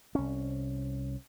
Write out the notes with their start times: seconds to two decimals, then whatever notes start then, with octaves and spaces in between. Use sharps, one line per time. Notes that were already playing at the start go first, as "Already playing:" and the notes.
0.15 C2 C#4